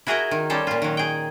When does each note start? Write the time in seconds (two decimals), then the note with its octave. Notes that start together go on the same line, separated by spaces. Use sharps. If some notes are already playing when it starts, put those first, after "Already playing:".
0.07 E4 F#4 G#4 A#4 D#5 A#5
0.31 D#3
0.50 G3 C#4 A4 C5
0.67 A#2 F4
0.82 D#3 F#3
0.97 G#4 G5